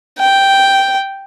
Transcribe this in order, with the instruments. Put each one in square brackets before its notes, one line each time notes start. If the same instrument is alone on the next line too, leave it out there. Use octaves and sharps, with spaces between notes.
[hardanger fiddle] G5